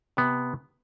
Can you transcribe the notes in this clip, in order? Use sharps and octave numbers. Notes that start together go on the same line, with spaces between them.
C3 B3